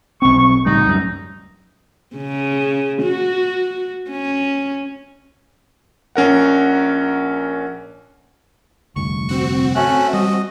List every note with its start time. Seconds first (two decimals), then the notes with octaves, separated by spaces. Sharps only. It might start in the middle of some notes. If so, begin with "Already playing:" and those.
0.22 B1 C4 C#6
0.38 C#6
0.66 C#2 A2 G3 D#4
0.85 F#2 G3
2.16 C#3
3.04 F#4
4.11 C#4
6.16 A#1 C#4 A#4 F#5
8.96 F1 D2 G2 C#6
9.29 C4 F#4
9.75 A3 C#4 F#6
10.13 G3 D#5